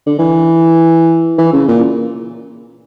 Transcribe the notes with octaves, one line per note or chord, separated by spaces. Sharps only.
D3
E3
E3
C#3
A#2